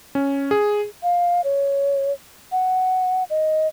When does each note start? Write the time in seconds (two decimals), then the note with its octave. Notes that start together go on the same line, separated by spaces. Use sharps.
0.15 C#4
0.51 G#4
1.03 F5
1.44 C#5
2.52 F#5
3.30 D#5